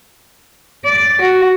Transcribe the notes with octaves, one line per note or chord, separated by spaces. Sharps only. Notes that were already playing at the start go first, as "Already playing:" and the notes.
D5
F#4